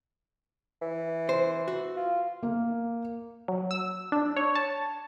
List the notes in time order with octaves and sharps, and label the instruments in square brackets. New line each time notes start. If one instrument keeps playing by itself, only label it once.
[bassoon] E3
[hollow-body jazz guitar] C5
F#4
[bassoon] F4
[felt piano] A#3
[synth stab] F#3
E6
D4
C#5
A5